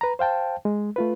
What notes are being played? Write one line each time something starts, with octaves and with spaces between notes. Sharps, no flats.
B4 A#5
C5 F5 G5 A5
G#3
A3 F4 B4